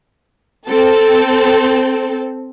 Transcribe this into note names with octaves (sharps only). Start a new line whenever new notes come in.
C4 A4